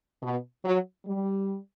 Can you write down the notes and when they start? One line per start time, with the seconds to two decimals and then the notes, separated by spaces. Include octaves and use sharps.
0.22 B2
0.64 F#3
1.06 G3